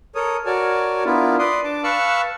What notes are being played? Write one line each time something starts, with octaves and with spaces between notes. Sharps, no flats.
A4 A#4 C#5 D#6
F#4 A#4 C#5 D5 G#5 A5
B3 D4 E4 F4 A#4
B4 D5 C6 D#6
D4 A5 D6
B4 F5 A5 C#6 E6 F#6